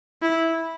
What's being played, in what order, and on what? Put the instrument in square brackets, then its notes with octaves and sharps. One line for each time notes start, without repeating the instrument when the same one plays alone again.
[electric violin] E4